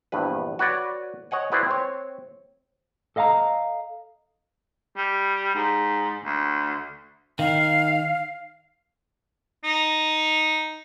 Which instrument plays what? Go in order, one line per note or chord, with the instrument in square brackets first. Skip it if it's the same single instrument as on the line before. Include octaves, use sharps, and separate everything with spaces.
[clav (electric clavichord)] A#1 E2 G2 B4
F#4 B4 C#5 D5
C#5 D#5 F#5 G#5
E4 F#4 G#4 B4 C5 D5
C4 C#5
[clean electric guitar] A4 D#5 F5 A5 A#5
[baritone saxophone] G3
G#2
D2
[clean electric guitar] D#3 [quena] F5
[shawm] D#4